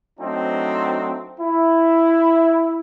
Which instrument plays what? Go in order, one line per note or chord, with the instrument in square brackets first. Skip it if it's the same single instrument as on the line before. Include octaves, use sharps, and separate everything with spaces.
[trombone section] F#3 A3 C4 D4 D#4 F#4
E4